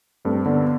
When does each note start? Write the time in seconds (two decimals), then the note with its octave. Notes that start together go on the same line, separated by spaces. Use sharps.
0.25 G2 A3 C4
0.46 D3 B3 D4